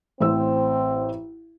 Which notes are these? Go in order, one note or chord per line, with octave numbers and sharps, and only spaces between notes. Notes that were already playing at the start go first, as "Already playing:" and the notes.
A1 C4 C5 E6